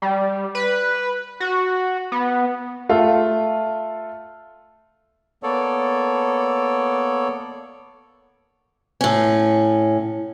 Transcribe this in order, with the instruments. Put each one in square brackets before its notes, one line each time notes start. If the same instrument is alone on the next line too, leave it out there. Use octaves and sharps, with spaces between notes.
[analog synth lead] G3
B4
F#4
B3
[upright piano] A3 F4 A4
[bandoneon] A#3 B3 A4 C#5 D5
[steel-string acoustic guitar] A2 C#4